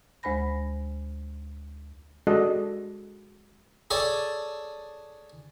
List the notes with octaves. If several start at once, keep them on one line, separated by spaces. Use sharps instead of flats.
D2 G#3 C5 G#5 B5 A#6
G#3 D4 F#4 A4 D#5
G#4 A4 C#5 D5 G#5 A5